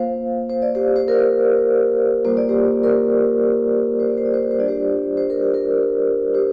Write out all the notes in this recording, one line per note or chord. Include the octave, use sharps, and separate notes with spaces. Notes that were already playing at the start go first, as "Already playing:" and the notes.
Already playing: A#3 F4 C5 F5
C5
D5
G4 C5
C5
A#4
G3 A#3 F4 C5
D5
G4 C5
A#4 D5
C5
D5
C5
D5
C5
D5
C5
G3 D4 F4 D5
G4 C5
C5
A#4
G4
A#4
G4 C5